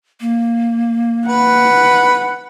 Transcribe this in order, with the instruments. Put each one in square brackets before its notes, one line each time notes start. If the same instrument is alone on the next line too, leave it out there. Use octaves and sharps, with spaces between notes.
[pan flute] A#3
[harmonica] B4 [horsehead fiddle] F#5